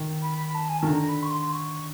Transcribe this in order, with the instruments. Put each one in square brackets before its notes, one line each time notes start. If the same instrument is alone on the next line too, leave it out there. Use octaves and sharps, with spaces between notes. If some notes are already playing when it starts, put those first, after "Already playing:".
Already playing: [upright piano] D#3
[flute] B5
A5
G#5
A5
[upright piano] D#3
[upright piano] D3 [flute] A#5
[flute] B5
C#6
C6
C#6